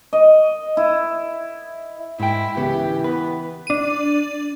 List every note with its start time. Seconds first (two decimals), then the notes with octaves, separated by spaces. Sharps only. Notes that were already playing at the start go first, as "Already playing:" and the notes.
0.13 D#5
0.77 E4
2.20 G#2 E4 G5
2.57 C#2 C#3 E3 B3 G4
3.04 B3 B4
3.67 D4 D#7